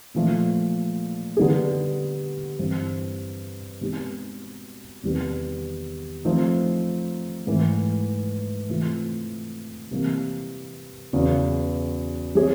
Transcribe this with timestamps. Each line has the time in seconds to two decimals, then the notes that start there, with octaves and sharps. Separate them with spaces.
0.14 A#2 F3 A3
1.37 D3 G3 B3 D#4 G#4
2.59 G2 E3 G3 C4
3.81 B2 G#3 C4 D#4 G4
5.03 E2 C3 D#3 G3 B3
6.25 F3 A3 C4 D#4
7.47 G#2 E3 A3
8.69 C3 E3 A3 C4 F4
9.91 C3 E3 G3 A#3
11.13 E2 C#3 F#3 B3
12.35 G3 C4 E4 G#4 C#5